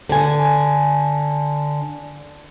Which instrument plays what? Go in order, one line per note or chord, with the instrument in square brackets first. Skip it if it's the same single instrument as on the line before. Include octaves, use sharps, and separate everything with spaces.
[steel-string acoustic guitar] D3 G#5